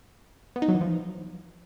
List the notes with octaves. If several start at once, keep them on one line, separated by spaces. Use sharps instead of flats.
B3
D#4
F#3
E3
F3